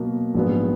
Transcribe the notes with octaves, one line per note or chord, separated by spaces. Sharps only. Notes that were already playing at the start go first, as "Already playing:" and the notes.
Already playing: B2 F#3 A#3
A#1 G#2 F#3 B3